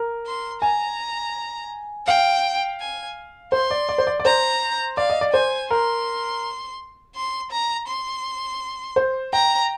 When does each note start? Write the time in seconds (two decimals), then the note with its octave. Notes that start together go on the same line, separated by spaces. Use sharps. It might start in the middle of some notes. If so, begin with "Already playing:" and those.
Already playing: A#4
0.26 C6
0.62 G#5 A#5
2.07 F5 G5
2.80 G#5
3.52 C5 C6
3.71 D5
3.89 D5
3.98 C5
4.07 D5
4.20 D5
4.25 C5 A#5
4.97 D5 F5
5.10 D#5
5.21 D5
5.33 C5 G#5
5.71 A#4 C6
7.16 C6
7.51 A#5
7.88 C6
8.96 C5
9.33 G5 A#5